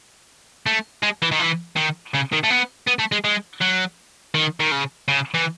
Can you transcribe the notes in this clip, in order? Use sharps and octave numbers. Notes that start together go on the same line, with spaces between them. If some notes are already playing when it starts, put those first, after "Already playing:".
A3
G#3
E3
D#3
E3
D#3
C#3
D#3
A3
B3
B3
A3
G#3
G#3
F#3
D#3
D#3
C#3
C#3
E3